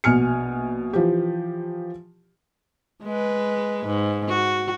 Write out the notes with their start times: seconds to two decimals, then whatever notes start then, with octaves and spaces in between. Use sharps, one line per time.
0.04 A#1 B2 G#5 F6 C#7
0.93 E3 F3 G4
3.03 G#3 B4
3.86 G#2
4.28 F#4